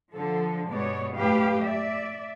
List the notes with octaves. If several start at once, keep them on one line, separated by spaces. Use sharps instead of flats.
D3 F3 A4
G2 B2 G#3 B3 C#5 D5
F#2 A2 G4 B4 F5
D5 E5